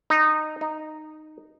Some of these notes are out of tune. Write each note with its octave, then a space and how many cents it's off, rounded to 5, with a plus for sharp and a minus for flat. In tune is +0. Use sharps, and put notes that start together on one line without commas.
D#4 -15
D#4 -10